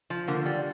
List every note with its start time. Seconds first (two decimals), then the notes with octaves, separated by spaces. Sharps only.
0.10 F3
0.28 D3 A#3
0.46 G3